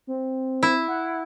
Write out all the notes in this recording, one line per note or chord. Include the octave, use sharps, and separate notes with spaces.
C4
E4
F#5